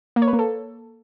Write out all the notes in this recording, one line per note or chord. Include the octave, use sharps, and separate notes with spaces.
A#3
C#5
B4
A#3
A4